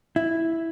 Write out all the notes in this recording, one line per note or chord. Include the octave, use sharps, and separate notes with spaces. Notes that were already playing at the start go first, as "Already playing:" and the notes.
E4